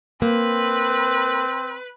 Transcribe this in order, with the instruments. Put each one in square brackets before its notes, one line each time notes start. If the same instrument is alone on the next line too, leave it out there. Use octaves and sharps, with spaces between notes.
[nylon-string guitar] A#3 [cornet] C4 [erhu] B4